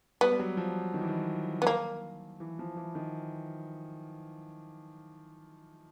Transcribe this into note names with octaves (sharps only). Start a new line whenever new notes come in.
G3 B3
G3
F#3
F3
D#3
E3
D#3
B3
A#3
E3
F3
E3
D#3